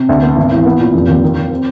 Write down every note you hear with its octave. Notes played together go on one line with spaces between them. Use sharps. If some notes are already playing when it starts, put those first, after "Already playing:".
Already playing: C3
D2
B3
G#1
E3
B3
A#2
F1
D#2
D#3
D#3
C4